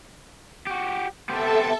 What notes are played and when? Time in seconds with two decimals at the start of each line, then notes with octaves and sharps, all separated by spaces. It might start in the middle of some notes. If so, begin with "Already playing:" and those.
0.67 F#4 G4
1.29 B3 G4 A4 C5 E5 A5